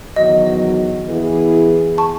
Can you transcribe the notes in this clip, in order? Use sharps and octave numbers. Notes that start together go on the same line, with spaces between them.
E2 D#3 F#3 B3 F#4 D#5
E3 B3 E4 G#4
A5 C#6